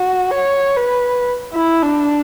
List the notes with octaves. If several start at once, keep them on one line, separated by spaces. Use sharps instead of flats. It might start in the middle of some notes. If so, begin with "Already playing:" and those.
Already playing: F#4
C#5
B4
E4
D4